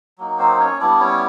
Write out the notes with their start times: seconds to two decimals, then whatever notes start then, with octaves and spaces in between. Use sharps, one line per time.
0.18 F#3 A#3 D#4
0.39 C4 C5
0.59 C#4 C#5
0.80 G3 B3 D4 E4 D5
1.00 C#4 C#5